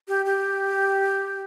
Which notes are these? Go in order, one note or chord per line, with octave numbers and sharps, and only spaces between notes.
G4
G4